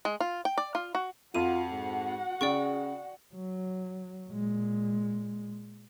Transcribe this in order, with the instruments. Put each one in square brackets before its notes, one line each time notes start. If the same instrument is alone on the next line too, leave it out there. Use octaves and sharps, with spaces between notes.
[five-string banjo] G#3
F4
G5
D5
F4
F#4
[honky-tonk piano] F2 [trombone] F4 [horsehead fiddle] F#4 F#5 [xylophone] D#7
[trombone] G#2
[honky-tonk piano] C#3 [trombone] G#4 [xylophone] D5 G5 C#6
[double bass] F#3
A#2 G#3